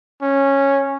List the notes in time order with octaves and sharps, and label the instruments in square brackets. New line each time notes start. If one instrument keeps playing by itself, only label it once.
[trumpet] C#4